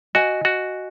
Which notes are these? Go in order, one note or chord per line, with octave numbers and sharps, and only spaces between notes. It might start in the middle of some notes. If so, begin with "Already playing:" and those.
F#4 D#5 G#5
F#4